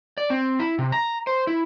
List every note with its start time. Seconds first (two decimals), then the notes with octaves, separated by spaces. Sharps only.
0.18 D5
0.30 C4
0.59 E4
0.79 C3
0.92 A#5
1.27 C5
1.47 E4